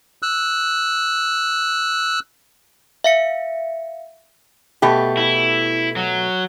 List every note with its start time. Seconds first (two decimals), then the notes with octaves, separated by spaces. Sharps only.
0.23 E6 F#6
3.04 E5 F5 C#7
4.82 B2 A3 G4
5.17 E4
5.96 F#3